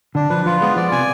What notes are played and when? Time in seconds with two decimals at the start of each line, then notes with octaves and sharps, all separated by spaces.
0.15 D3 D4
0.30 F3 B4
0.46 F3 F4
0.61 G#3 B3
0.76 F3 D5
0.92 C3 G#5